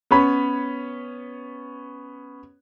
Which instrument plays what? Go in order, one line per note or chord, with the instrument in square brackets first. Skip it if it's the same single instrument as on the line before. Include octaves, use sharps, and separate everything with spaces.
[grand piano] B3 C#4 C#5 B5